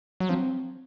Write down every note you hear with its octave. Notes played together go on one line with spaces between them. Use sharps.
F#3
F3 C4